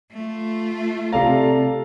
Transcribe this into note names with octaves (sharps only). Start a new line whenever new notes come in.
A3 F4
C3 A4 D5 F5 A#5